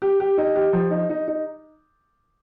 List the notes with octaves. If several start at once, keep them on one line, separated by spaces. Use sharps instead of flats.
G4
G4
D#4
G4
F3
D#4
D#4
D#4